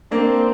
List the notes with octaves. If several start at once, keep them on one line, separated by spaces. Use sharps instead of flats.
A#3 C4 D4